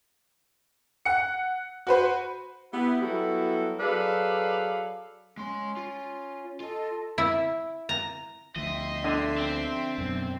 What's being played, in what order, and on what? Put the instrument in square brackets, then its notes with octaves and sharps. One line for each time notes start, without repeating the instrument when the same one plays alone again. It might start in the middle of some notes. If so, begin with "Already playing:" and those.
[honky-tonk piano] F#5 C#7
F#4 B4 C5
[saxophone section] B3 E4 G4
F#3 G3 B3 E4 F#4 A4
F#3 G#4 A4 B4 D5 F5
[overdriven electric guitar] G#3 C6 [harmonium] C#4
[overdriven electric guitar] F4
[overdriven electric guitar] F4 [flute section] A4 D#5
[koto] E4
A#5
[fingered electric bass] D2 F3 [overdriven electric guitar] D#5 [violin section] E5 G5 C6
[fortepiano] D3
[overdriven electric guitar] C4
[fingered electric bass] F#2 B2